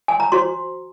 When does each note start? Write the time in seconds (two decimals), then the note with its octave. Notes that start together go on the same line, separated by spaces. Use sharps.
0.08 G#5
0.20 A#5
0.32 F#4 C5 C6